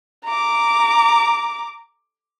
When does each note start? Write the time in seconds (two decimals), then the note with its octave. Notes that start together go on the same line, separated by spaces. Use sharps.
0.24 A#5 D6